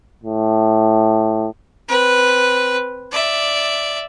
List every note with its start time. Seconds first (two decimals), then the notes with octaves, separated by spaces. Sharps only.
0.24 A2
1.88 C4 B4
3.11 D5 E5